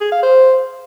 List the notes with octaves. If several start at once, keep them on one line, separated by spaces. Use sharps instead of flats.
G#4
F5
C5